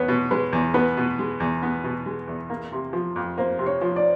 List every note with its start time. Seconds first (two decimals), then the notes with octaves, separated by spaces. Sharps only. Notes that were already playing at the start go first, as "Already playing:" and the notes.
Already playing: E2 B3 B4 C#5
0.08 B2
0.31 G#3 B4
0.53 E2
0.74 B3 B4
0.97 B2
1.19 G#3
1.40 E2
1.62 B3
1.84 B2
2.06 G#3
2.28 E2
2.50 A#3
2.72 C3
2.93 F3
3.16 F2
3.38 A#3 C5
3.59 C3
3.66 C#5
3.82 F3
3.96 D5